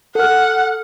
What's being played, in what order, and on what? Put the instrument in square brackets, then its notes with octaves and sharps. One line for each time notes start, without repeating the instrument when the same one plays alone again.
[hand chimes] A4 F6 [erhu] F#5